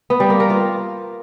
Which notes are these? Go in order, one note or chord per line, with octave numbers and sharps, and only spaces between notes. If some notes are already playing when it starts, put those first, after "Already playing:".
B3
G3
A#3
A#4
F4